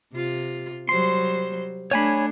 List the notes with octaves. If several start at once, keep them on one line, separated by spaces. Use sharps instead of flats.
C3 F4
F#3 G3 C5 C6
A3 D4 C#5 G#5 B5